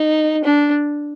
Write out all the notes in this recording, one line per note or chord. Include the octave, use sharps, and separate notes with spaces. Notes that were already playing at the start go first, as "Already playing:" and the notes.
Already playing: D#4
D4